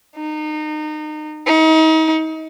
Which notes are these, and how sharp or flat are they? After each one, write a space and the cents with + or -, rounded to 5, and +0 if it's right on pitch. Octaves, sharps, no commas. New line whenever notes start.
D#4 -30
D#4 +35